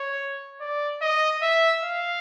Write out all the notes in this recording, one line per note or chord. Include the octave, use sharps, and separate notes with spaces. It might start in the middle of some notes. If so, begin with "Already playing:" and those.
Already playing: C#5
D5
D#5
E5
F5